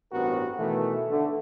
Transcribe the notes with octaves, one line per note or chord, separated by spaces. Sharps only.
A1 G2 B3 C4 F#4 A#4
B2 D#3 E3 A3
D3 A3